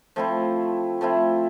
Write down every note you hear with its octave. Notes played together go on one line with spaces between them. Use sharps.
F3 A3 C4 E4
F3 A3 C4 E4